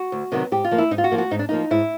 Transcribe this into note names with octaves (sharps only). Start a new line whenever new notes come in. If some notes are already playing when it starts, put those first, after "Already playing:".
Already playing: F#4
D2
C3 D#3 F#3 B3
G#2 G4
F4
F3 A#3
E4
G#2 D#4
F4
F#4
F3 A#3
F#4
G#2 D#4
D4
F3 A#3 D#4
G#2 E4